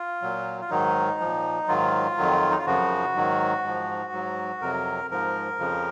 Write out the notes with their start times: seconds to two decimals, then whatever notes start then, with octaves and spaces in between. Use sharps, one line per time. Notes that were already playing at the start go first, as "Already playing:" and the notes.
Already playing: F4
0.22 A#2 F#3
0.61 F4
0.70 G#2 D#3 F#3 D#4
1.20 A#2 F3
1.68 G#2 D#3 F#3 F4
2.17 F2 D#3 F#3
2.51 D#4
2.58 F4
2.66 F#2 C#3 F3 F#4
3.15 G#2 D#3 F#3
3.64 G#2 F3
4.12 G#2 F#3
4.61 F2 C3 F#3 A#4
5.11 G#2 F3 A#4
5.59 F2 C#3 F3